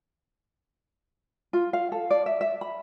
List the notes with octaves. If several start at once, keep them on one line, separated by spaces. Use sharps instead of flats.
F4
F5
A4
D5
E5
E5
B5